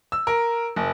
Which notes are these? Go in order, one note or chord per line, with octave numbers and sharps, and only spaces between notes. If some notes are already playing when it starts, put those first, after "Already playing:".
E6
A#4
F#1